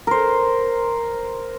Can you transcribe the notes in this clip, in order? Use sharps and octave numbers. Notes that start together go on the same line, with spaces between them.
A#4 C5